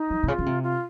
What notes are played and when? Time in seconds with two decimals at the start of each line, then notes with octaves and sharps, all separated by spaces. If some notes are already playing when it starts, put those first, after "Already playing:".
Already playing: D#4
0.10 F3
0.23 C3
0.28 C#3 F4
0.39 C#3
0.46 C3
0.63 F4